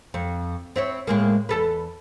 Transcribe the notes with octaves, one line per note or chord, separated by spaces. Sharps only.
F2
C4 E4 C#5
A2 G#3 A#3
E2 A4 B4